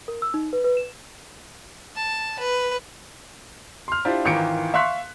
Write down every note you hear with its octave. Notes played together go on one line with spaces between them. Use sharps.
A#4
E6
D#4
B4
B4
E7
A5
B4
C6 F6
D4 E4 F4 G4 C5 D5
G#1 D#3 E3 F4 C#7 D7
E5 F5 C6 C#6 F#6 B6